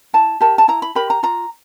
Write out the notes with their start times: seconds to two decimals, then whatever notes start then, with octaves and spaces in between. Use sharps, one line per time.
0.13 E4 A5
0.41 G4 A#4 A5
0.58 A5
0.68 E4 A#5
0.82 B5
0.95 G4 A#4 B5
1.10 A#5
1.23 F4 A#5